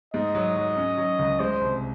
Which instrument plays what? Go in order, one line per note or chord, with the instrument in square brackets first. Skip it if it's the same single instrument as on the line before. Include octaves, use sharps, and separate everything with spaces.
[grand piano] G#2 [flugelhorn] D#5
[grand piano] F#3
F#3
C#4
F#3
C#2
[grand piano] G#3 [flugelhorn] C5
[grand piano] C2